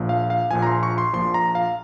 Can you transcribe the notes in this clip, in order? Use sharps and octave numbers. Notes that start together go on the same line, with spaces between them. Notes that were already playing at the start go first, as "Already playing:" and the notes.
Already playing: A#1 A#2 F3
F5
F5
A#1 A#2 F3 G#5
A#5
C6
C#6
C6
A#1 A#2 F3 C6
A#5
F5